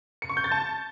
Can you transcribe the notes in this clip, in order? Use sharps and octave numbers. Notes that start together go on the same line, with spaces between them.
C#7
C#6
G6
A6
A5